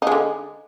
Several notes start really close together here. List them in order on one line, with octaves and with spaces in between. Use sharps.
D#4 G#3 D3